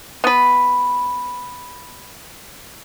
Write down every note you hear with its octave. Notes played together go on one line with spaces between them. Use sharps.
B3 B4